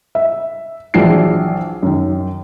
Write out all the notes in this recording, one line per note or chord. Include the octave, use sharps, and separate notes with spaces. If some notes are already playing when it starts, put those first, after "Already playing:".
E5
A#1 E3 F#3 D4 G#4 C7
F#2 D#3